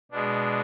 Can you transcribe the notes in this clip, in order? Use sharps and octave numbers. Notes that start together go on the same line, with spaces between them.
B2 G#3 D4